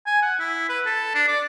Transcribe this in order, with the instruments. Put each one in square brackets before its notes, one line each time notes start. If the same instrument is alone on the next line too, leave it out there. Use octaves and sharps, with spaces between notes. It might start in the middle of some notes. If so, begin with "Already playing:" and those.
[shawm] G#5
F#5
E4
B4
A4
D4
D5